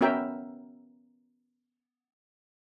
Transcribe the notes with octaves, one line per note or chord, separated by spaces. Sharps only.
B3 C#4 F#4 A#4 E5 G5